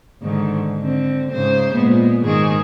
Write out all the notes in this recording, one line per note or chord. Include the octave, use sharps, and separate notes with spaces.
G#2 D3 D#3
D3 C4
G#2 C#3 C5
A#2 G#3 B3
G#2 D#3 G#4